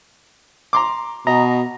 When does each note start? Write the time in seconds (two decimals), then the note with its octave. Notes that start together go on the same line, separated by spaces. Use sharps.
0.73 A#5 C6 D6
1.27 B2 D#5 A#5